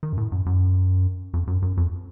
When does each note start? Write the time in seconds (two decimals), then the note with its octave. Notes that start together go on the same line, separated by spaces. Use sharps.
0.03 D#3
0.13 F#2
0.18 A2
0.32 F#2
0.46 F#2
1.34 F2
1.47 F#2
1.62 F#2
1.77 F2